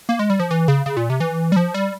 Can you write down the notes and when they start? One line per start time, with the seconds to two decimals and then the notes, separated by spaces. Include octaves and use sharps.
0.09 A#3
0.19 G#3
0.30 G3
0.40 F3
0.51 E3
0.68 C#3
0.86 C#3
0.97 A#2
1.10 C3
1.20 E3
1.52 G3
1.56 F3
1.74 G3